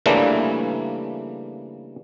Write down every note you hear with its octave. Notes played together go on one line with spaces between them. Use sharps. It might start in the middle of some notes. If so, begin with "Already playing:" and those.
C#3 E3 G3 A3 A#3 D4